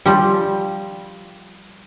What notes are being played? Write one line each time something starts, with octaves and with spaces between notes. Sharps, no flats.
F3 G3